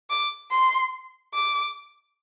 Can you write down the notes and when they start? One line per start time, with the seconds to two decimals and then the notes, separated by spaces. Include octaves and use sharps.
0.10 D6
0.51 C6
1.34 D6